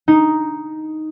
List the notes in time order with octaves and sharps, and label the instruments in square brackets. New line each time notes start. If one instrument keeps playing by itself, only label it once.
[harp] D#4